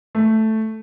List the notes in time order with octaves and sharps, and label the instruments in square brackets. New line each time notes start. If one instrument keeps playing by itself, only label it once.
[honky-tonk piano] A3